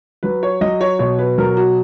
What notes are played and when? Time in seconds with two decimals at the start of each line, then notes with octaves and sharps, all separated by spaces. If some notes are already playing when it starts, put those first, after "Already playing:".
0.23 F#3 B4
0.43 C#5
0.61 F#3 D#5
0.81 C#5
0.99 B2 C#5
1.19 B4
1.38 F#3 A#4
1.57 F#4